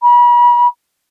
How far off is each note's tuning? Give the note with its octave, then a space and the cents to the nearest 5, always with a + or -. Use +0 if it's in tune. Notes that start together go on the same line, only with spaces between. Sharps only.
B5 -40